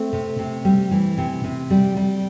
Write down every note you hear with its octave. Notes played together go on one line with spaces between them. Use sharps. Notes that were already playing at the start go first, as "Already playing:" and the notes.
Already playing: A3 C4
C3
C3
G3
E3
C3
C3
G3
G3